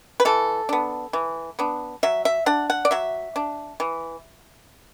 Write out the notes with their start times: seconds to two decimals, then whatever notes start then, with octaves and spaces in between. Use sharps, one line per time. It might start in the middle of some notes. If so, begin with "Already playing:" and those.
0.20 B4
0.25 E3 A4
0.69 B3 D4
1.13 E3
1.59 B3 D4
2.03 F#3 E5
2.25 E5
2.46 D4 F#5
2.70 F#5
2.85 D5
2.91 F#3 E5
3.36 D4
3.80 E3